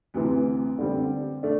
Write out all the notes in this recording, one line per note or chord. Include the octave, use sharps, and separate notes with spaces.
D2 C3 E3
D3 G3 C4
A3 D4